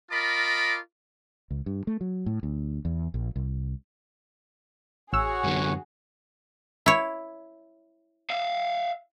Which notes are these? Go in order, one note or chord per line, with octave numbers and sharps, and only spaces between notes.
F4 A#4 D#5 A5 B5 D6
C#2
G2
A3
F#3
A2
D2
E2
A#1
C2
A1 F#4 G#4 C#5 F#5 E6
F#2 D3
E4 C#5
E5 F5